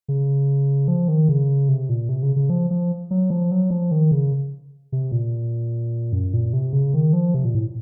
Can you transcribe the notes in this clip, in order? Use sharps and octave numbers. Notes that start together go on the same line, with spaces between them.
C#3
F3
D#3
C#3
C3
A#2
C3
C#3
C#3
F3
F3
F#3
F3
F#3
F3
D#3
C#3
C3
A#2
F#2
A#2
C3
C#3
D#3
F3
C3
A#2
A2